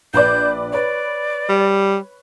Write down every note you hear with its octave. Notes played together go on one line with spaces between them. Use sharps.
A#1 B4 D5 G6
B4 C#5 D5
G3